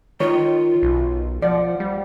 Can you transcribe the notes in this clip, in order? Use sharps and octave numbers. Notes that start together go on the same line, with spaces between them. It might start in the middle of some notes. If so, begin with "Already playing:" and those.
D#3 F4 C#5
B1
F3 D5 F#5
G3